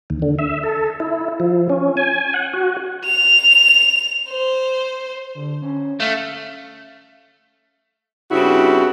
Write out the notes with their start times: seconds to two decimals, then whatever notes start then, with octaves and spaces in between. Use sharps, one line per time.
0.10 D#2
0.22 D3
0.39 E5
0.63 A4
1.00 E4
1.40 F3
1.69 C#4
1.97 G#5
2.34 F#5
2.54 F#4
3.06 F7
4.29 C5
5.35 D3
5.62 C#4
6.00 A3 F5
8.31 G2 C#3 C4 E4 F#4